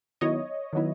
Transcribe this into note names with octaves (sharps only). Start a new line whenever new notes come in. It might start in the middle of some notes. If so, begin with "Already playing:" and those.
D#3 F#3 B3 E4 C#5 D#5
D#3 F#3 B3 E4